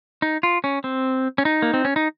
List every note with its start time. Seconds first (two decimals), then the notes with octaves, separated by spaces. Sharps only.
0.22 D#4
0.43 F4
0.64 C#4
0.84 C4
1.38 C#4
1.45 D#4
1.62 A#3
1.74 C4
1.85 C#4
1.96 D#4